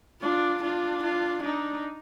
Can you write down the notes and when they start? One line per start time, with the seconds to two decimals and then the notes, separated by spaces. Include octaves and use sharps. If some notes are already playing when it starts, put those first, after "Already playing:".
0.22 D4 F4
0.62 D4 F4
1.03 F4
1.42 D4 D#4